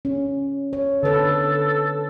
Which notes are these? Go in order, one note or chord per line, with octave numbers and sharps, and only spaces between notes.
C#4
C#5
D3 A4 B4 C#5